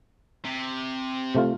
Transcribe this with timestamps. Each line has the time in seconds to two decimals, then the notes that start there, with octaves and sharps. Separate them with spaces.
0.45 C3
1.35 C3 A3 F4